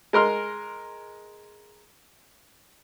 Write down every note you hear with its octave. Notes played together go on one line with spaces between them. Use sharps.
G#3 A#4 C6 F6